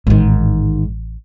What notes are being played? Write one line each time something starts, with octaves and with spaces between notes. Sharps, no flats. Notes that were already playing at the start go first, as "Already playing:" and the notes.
A1 G#2 D#3